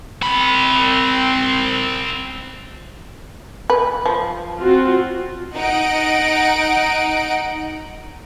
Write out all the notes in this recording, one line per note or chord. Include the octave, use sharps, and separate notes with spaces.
C4 B5
B4
F3
C4 F4 F#4
D#4 F#5 D7